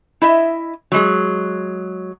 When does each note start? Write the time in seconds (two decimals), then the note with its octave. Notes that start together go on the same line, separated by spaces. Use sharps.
0.22 E4 D#5 E5
0.92 F#3 G#3 G#4